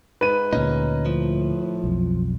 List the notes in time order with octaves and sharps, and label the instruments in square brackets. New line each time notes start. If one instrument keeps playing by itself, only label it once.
[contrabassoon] G#2 [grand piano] B4 D#7
[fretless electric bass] D2 A#2 [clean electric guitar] C#4 D#4
[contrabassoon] A2 [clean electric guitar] F3
[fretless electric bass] B1 F2